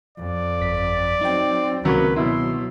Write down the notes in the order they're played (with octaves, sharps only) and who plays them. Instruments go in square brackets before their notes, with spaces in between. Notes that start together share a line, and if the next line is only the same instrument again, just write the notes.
[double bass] F2 [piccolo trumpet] D5
[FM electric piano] G1 B6
[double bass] F#3 C4 [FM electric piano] D#4 G5
[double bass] C#2 C3 [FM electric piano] D#3 C4 [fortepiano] F#3 A#3 C#4 [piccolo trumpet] B4
[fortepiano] B2 E4 [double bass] F#3 [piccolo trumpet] C6